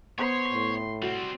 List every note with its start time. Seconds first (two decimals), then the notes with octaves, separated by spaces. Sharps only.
0.18 B3 C5 C#5 C6
0.51 A2
1.02 G3 C4 F#4